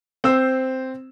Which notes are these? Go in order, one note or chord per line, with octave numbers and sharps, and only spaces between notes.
C4 C5 E6